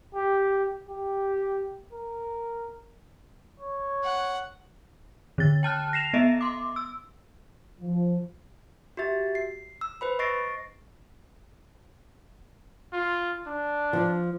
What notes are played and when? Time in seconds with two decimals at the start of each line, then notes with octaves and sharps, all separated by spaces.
0.14 G4
0.88 G4
1.93 A#4
3.60 C#5
4.04 F#5
5.38 D3 A6
5.63 G5 A5 F6 F#6
5.93 A#6 C7 E7 F7
6.13 B3 D#5 E5
6.41 C6 D6
6.76 E6
7.80 F3
8.97 F#4 G4 E5 A6
9.35 C7
9.81 E6
10.01 B4 C5 B5
10.19 D#5 C#6 A6 A#6 C7 D7
12.93 F4
13.47 D4
13.93 F3